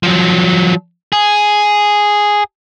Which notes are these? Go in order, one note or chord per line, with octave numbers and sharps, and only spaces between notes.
F3 F#3
G#4